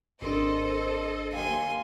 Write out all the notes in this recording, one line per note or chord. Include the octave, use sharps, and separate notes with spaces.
G#1 C4 D4 A4 A#4 C5 D#5 C6
D#2 F5 G5 G#5 C6